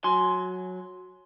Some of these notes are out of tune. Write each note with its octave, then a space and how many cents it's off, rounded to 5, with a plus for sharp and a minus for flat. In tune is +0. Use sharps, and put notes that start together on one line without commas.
F#3 -10 G#5 +25 C6 +0